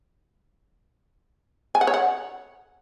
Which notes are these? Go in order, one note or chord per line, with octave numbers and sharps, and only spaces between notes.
G#5
F#5
C#5
F#5